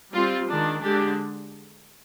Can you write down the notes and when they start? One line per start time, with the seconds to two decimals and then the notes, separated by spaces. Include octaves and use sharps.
0.12 G3 C4 F4
0.48 D#3 G#3 D4
0.82 D3 G#3 D4 G4